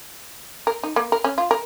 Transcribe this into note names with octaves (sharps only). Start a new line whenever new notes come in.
A#4
D#4
A#3
A#4
C#4
F4
A#4